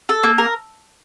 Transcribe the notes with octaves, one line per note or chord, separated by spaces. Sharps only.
A4
A#3
A#4